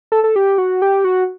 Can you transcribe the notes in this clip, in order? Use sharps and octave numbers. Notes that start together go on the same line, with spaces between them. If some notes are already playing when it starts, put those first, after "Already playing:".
A4
A4
G4
F#4
G4
F#4